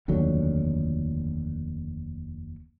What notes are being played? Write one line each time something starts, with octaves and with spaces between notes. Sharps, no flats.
F1 D#2 D3 F#3